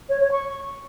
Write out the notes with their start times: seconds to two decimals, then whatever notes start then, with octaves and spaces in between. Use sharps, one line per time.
0.09 C#5
0.20 C#5
0.31 C#6